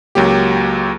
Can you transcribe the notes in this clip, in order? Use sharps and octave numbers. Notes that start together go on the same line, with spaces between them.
C#2 F#3 A#3 G4